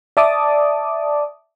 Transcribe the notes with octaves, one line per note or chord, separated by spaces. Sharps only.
D5 E5 A5 D6 D#6